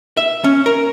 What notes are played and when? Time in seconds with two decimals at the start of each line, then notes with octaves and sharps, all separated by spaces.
0.17 E5
0.44 C#4
0.66 A#4